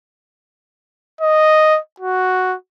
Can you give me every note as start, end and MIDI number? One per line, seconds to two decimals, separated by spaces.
1.21 1.79 75
2.00 2.55 66